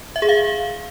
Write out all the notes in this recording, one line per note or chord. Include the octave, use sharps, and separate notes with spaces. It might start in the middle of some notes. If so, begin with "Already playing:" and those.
E5
G#4
F5